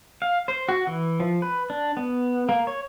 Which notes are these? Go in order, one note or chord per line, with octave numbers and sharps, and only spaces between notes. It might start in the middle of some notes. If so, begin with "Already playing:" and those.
F5
C5
F#4
E3
F3
B4
D4
B3
A#3
C#5